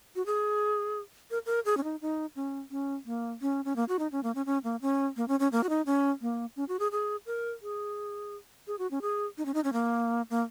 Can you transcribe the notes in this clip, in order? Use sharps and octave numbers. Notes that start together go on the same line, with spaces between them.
F#4
G#4
A#4
A#4
G#4
C#4
D#4
D#4
C#4
C#4
A#3
C#4
C#4
A#3
F#4
D#4
C#4
A#3
C#4
C#4
A#3
C#4
A#3
C#4
C#4
A#3
F#4
D#4
C#4
A#3
C#4
F#4
G#4
G#4
A#4
G#4
G#4
F#4
C#4
G#4
D#4
C#4
D#4
C#4
A#3
A#3